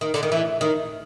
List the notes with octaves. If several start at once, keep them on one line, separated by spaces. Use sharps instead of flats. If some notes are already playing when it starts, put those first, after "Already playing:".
D#3
D3
D#3
E3
D#3